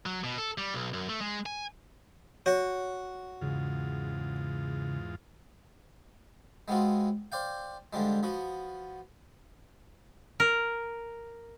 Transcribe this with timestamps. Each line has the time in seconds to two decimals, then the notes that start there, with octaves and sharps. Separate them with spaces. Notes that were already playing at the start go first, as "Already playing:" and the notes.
0.06 F#3
0.24 B2
0.38 A4
0.58 G3
0.74 B1
0.93 F#2
1.09 A3
1.21 G#3
1.46 G#5
2.46 F#4 C#5
3.41 E2 G#2 C#3 F4
6.68 G#3 B3 C4 F4 F#4
7.32 C5 D5 F5 G5
7.93 D3 F3 G3 G#3
8.23 F3 B3 F#4
10.40 A#4